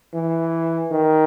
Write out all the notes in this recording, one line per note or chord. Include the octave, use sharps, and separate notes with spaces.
E3
D#3